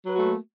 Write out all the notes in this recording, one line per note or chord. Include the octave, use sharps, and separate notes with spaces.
F#3 A3 A#3 F#4 B4